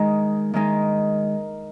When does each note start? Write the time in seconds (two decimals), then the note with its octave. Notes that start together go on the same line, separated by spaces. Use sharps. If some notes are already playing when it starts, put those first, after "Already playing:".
Already playing: D#3 G#3 D#4
0.54 D#3 G#3 D#4